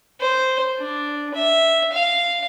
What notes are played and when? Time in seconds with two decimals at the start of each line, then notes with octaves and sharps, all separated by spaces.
0.21 C5
0.78 D4
1.34 E5
1.92 F5